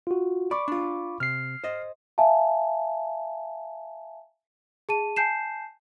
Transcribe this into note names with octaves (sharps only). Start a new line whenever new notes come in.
F4 F#4
D5 B5 C#6 D6
D4 F4
C3 F6 C7
C5 D#5
E5 F5 G#5 A5
G#4 A5 D#7
G#5 A5 G6 C7 E7